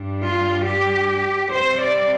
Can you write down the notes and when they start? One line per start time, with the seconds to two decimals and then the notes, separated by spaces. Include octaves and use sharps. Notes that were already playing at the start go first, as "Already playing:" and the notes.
Already playing: G2 G3 D4
0.24 F4
0.66 G4
1.52 C3 G3 C4 C5
1.80 D5